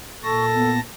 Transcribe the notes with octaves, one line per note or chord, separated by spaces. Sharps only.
A#2 A4 A5 C#6 A#6
B3